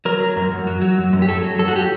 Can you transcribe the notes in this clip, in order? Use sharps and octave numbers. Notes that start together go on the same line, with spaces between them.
F#3 A#4
F#3
F#2
F#2
F#3
F#3
F#2
F#2
G4
F#3 A4
F#3
F#2 A4
F#4
G4